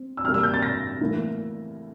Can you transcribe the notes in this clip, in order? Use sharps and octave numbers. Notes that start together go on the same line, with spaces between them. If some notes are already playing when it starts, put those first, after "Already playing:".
Already playing: C4
E6
C3 G3 A#3 F6
E6
G6
A6
A#6
A2 E3 A#3